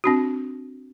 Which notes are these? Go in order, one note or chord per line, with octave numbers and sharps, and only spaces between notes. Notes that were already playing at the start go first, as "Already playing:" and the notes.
C4 D4 F#4